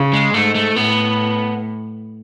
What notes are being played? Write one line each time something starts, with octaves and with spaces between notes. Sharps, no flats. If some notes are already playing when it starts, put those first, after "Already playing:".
Already playing: C#3
G#3
G#2 A3
A3
A2 B3